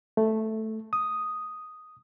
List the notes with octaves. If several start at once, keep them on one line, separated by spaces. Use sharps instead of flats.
A3
D#6